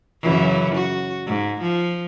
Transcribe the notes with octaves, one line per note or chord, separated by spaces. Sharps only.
F#2 C#3 E3
F#4
G#2
F3